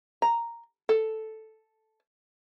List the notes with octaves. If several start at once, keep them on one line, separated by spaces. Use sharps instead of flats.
A#5
A4